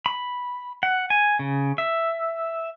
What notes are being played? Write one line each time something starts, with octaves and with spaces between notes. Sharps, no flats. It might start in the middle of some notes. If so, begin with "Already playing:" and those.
B5
F#5
G#5
C#3
E5